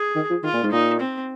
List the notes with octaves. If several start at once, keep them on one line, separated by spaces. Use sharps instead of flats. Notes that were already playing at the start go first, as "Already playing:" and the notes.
Already playing: G#4
D#3
F3
D#3 F4
A#2
G#2
A#2 D#4
C4